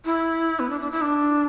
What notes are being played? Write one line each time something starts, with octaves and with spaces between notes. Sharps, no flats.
E4
B3
D4
D4
E4
D4